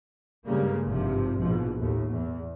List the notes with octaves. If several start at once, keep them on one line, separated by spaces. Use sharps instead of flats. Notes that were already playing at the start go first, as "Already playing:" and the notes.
G2 C#3 G3 G#3 A#3
G#1 G2 C3 F3
A#1 G#2 B2 F3
D#2 A2
E2